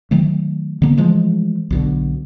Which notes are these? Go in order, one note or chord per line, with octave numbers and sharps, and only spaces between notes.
D#3 F#3 A3
D3 A#3 B3
E3 F3 G#3 A3
B1 B2 D3